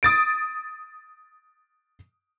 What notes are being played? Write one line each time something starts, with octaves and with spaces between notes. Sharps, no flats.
D#6 A6 D7